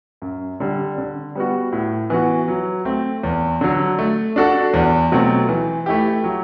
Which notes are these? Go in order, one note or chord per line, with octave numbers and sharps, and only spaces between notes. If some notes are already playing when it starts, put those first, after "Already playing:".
F#2
D3 G3
D3
G3 B3 F#4
A2
E3 B3 F#4
F#3
A3 C4
E2
D3 F#3
A3
D4 F#4 A4
E2
B2 F#3 A3 C4
E3
A3 E4 G4
F#3